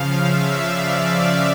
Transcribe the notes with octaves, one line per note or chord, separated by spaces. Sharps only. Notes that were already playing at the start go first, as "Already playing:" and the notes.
Already playing: C#3 F3 F5
E5
D5
D5